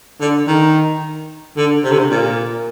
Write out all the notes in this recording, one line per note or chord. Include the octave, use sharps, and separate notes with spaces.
D3
D#3
D3
C3
D3
C3
A#2